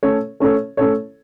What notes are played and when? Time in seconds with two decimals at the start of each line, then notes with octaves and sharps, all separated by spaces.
0.03 A3 C#4 A4 C#5
0.40 A3 C#4 A4 C#5
0.77 A3 C#4 A4 C#5